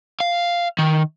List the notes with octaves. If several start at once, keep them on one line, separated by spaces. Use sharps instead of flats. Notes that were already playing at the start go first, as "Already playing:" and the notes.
F5
D#3